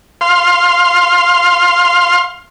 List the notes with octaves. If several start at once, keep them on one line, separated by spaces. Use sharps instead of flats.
F5 C6